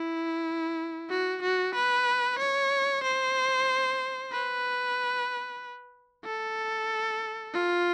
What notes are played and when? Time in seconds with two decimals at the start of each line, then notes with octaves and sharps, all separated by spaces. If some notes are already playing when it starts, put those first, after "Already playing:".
Already playing: E4
1.09 F#4
1.42 F#4
1.74 B4
2.39 C#5
3.03 C5
4.32 B4
6.24 A4
7.54 F4